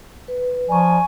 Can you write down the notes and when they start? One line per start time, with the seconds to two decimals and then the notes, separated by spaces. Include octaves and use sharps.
0.28 B4
0.69 F3 D5 G#5 A#5 C#6